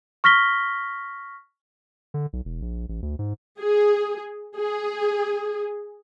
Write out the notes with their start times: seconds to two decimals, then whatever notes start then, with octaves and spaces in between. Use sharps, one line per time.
0.24 C#6 F6 A#6 B6 G7
2.14 D3
2.33 B1
2.45 E1
2.62 A#1
2.89 A1
3.02 D2
3.19 G#2
3.60 G#4
4.56 G#4